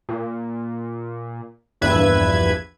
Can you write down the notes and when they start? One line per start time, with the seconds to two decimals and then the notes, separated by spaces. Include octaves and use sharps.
0.09 A#2
1.81 A#1 E2 G2 B4 E5 G#6